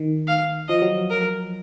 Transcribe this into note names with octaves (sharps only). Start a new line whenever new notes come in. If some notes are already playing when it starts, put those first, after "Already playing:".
Already playing: D#3
F5
F3 D#5
F#3
A#4